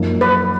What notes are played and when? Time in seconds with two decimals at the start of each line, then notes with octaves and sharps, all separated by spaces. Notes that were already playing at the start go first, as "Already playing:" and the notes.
Already playing: F#2 F3 A#3 D#4
0.21 B4